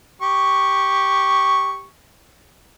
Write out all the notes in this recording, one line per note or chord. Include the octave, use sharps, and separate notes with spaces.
G4 C#6